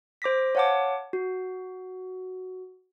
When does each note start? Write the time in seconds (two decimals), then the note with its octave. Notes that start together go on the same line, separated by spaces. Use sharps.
0.22 C5 D6 A#6 B6
0.55 C#5 F5 F#5 A5 D6
1.13 F#4